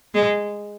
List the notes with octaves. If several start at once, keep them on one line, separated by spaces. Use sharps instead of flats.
G#3